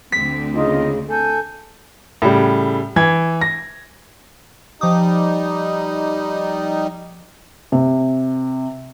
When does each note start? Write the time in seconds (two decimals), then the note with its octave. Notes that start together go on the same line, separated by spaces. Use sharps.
0.12 D2 D3 C4 B6
0.54 C#3 D#4 F4 D#5
1.08 A4 G#5 G6
2.22 A2 C#3 G3
2.96 E3 G#6
3.41 A#6
4.81 F3 G3 D#4 D6 D#6
7.72 C3